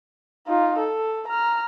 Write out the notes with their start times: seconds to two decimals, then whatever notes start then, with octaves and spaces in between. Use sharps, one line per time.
0.47 D#4 F4
0.78 A4
1.28 A#5 F6